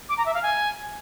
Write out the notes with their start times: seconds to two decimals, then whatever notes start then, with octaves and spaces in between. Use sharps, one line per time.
0.09 D6
0.17 A#5
0.26 E5
0.34 F5
0.43 G#5